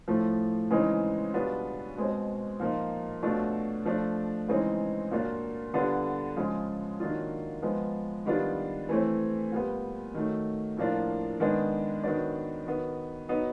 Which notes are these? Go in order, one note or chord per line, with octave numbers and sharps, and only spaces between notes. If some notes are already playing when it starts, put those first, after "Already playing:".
A2 F3 A3
C#3 E3 G#3 C4 D#4
B2 G3 B3 D4 F4
B2 G#3 C4
A#2 F3 A#3 D#4
B2 F#3 A3 D4 F4
F3 A3 D4
C#3 E3 G#3 C4 D#4
A#2 F#3 A#3 D4 F4
D3 G3 B3 D4 F4
C#3 F3 G#3
D#3 F#3 A#3 D4 F4
F3 G#3 B3
D#3 G3 B3 D4 F4
E3 A3 C4
A#2 G3 B3
D#3 F#3 A3
A2 F3 A#3 D4 F4
D#3 G#3 B3 D4
D#3 F#3 B3 D4
D#3 F#3 B3
F#3 B3 D#4